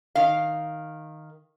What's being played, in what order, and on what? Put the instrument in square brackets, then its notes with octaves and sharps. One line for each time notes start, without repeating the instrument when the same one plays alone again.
[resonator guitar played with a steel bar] D#3 F5